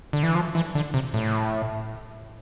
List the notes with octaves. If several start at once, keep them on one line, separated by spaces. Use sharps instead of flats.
D3
E3
F3
E3
D3
C3
A2